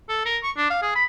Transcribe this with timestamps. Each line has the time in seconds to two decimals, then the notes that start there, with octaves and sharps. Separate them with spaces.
0.09 A4
0.25 A#4
0.43 C#6
0.56 D4
0.70 F5
0.82 G#4
0.95 B5